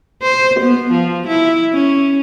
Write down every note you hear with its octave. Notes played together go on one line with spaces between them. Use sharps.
C5
B3
F3
E4
C#4